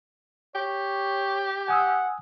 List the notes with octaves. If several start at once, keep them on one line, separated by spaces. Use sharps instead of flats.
G4 C#5
F#5 G#5 D#6 E6